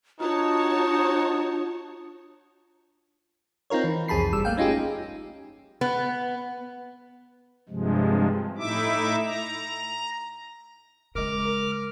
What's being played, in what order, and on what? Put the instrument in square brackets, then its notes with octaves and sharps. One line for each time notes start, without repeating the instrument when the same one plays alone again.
[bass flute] D4 [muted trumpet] D#4 [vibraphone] F4 [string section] F#4 C#5 A5
[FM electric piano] C4 D#4 F4 A#4 C#5
E3
C2 F2 G#4 A5 B5 C7
G1 G3 E6
A3 A#3 F5 G5
C#4 D#4 F4 G4 G#4
[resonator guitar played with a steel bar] B3
[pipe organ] G2 C3 F3 G#3
A2 D#4 E4 E5 D6
A#5
[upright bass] C#3 G#3 [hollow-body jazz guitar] A#4 D#5 [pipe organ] D6 F6
[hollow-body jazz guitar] A#4